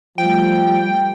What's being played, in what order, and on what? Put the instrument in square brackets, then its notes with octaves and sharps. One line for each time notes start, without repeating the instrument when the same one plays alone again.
[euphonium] F3 [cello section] G3 A3 [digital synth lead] G5